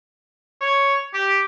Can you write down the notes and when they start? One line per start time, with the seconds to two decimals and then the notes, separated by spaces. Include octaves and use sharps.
0.61 C#5
1.14 G4